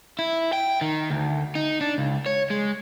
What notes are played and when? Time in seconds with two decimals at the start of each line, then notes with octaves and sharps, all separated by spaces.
0.19 E4
0.53 G5
0.81 D#3
1.10 D2
1.55 D#4
1.81 D4
1.98 C#2
2.26 C#5
2.50 G#3